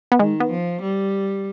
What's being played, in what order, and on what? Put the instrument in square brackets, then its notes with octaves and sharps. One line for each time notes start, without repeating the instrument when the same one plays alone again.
[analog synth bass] B3
[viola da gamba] D#3 [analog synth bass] G#3
[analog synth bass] B3
[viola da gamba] F3
G3